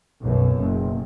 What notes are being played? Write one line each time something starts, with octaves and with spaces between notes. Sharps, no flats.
B1 F#2 B2
F#1